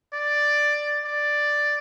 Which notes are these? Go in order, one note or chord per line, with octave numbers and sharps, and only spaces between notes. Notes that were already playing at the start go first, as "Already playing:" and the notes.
D5
D5